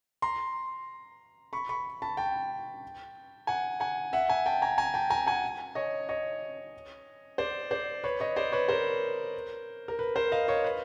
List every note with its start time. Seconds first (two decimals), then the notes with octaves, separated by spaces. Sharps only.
0.22 A#5 C6
1.53 B5 C#6
1.69 B5 C#6
2.02 A5 B5
2.17 G5 A5
3.47 F#5 G#5
3.80 F#5 G#5
4.13 E5 F#5
4.29 F#5 G#5
4.46 G5 A5
4.62 G#5 A#5
4.78 G#5 A#5
4.94 G5 A5
5.10 G#5 A#5
5.27 F#5 G#5
5.75 C#5 D#5
6.09 C#5 D#5
7.38 C5 D5
7.71 C5 D5
8.04 B4 C#5
8.20 C#5 D#5
8.36 C5 D5
8.52 B4 C#5
8.69 A#4 C5
9.88 A#4
9.99 B4
10.16 A#4 C5
10.32 D#5 F5
10.48 C#5 D#5
10.64 B4